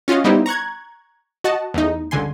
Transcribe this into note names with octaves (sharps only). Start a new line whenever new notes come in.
C#4 F4 F#4 D#5 F5
G3 B3 D#4 E4 G4 C5
A#5 C#6 F#6 G#6
F#4 D#5 F#5 A5
E2 A3 D#4
G1 C#2 D3 G#5 C6